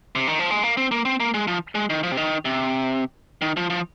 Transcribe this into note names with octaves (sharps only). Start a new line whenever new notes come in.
C3
D#3
F3
G#3
A#3
C4
A#3
C4
A#3
G#3
F3
G#3
D#3
F3
C3
D#3
C3
D#3
F3
F3